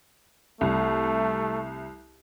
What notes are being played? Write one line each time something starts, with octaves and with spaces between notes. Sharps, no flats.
C2 A3